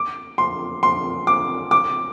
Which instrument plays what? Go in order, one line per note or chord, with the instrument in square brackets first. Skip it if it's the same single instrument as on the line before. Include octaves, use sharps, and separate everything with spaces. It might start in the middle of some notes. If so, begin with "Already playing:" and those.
Already playing: [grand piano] D6
C6
C6
D6
D6